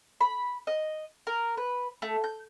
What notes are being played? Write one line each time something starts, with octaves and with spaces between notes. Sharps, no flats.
B5
D#5
A#4
B4
A3
G6